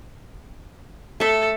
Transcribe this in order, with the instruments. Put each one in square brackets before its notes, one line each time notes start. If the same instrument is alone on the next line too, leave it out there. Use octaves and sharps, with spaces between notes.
[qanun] A3 E5 [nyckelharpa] A4